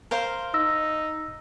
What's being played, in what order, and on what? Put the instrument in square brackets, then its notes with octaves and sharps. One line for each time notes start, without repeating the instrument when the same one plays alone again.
[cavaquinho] A#4 C5 F5
[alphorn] D#4 [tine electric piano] E6 A#6